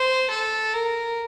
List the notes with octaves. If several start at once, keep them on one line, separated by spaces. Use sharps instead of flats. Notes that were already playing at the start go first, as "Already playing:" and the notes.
Already playing: C5
A4
A#4